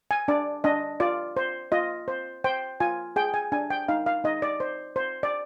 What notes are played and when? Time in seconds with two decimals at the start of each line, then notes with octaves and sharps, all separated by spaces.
0.11 G#5
0.28 D4 D5
0.64 D4 D#5
1.00 F4 D5
1.37 C5
1.72 F4 D#5
2.08 C5
2.44 C5 G5
2.80 F4 G#5
3.16 G#4 G5
3.34 G#5
3.52 D4 G#5
3.70 G5
3.88 D#4 F5
4.06 F5
4.24 D#4 D#5
4.42 D5
4.60 C5
4.96 C5
5.23 D5